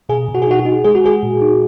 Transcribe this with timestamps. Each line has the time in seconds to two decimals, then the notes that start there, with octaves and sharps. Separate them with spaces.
0.09 B2 G#4
0.28 B2
0.35 F#4
0.42 G#4
0.47 D#4 F#4
0.59 F#4
0.65 D#4
0.84 G#3 G#4
0.95 F#4
1.04 G#3 G#4
1.23 A#2
1.41 D#4